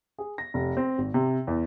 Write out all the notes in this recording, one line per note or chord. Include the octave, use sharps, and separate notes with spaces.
G#4
A#6
F1
C4
G#1
C3
E2